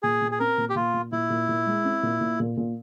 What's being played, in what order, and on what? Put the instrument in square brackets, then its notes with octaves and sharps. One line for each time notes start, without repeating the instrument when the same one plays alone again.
[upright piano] A#2 [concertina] G#4
[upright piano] A#2
[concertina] G#4
[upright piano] C4 [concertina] A#4
[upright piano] A#2
[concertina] G4
[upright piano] A#2 [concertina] F4
[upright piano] A#2
[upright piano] A#2 [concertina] E4
[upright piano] A#2
A#2
G#3
C4
A#2
A#2
A#2
A#2